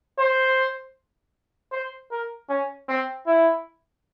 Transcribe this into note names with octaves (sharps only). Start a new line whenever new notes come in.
C5
C5
A#4
C#4
C4
E4